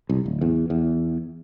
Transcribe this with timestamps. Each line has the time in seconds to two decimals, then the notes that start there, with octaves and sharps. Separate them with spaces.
0.09 C2
0.26 D1
0.41 E2
0.70 E2